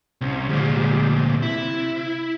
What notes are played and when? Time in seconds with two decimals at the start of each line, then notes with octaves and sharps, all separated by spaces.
0.21 C2 C4 C#4
0.49 D2 A#2 F3 G3 G#3
1.22 C3
1.42 E4